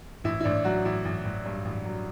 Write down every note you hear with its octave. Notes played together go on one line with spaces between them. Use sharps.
A1 E4
E4
A1 D4
F#3 F#4
A1 E4
A1
A1
G2
A1
F#3